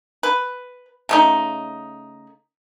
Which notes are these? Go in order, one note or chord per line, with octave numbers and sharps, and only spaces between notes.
B4
C#3 A3 D#4